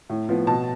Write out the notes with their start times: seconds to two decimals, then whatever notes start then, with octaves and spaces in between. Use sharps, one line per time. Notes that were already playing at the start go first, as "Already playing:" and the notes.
0.10 A2
0.29 F3 B3
0.47 B2 A5